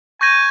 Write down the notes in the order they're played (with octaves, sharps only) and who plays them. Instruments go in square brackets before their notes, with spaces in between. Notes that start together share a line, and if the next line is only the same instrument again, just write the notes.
[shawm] G#5 [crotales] C#6 G6 A#6 D#7